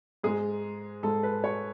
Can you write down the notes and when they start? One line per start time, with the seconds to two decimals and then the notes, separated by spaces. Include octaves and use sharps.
0.23 G#2 G#3 G#4
1.03 G#2 G#3 A4
1.23 B4
1.44 C#5